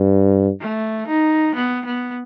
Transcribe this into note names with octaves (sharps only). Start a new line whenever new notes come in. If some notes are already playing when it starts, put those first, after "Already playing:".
Already playing: G2
A3
D#4
B3
B3